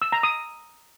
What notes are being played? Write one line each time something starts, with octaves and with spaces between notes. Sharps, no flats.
E6
A#5
D#6